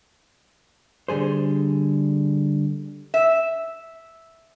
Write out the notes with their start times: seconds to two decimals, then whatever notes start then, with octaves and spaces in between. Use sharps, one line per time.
1.08 D3 G3 G#4 C5
3.14 E5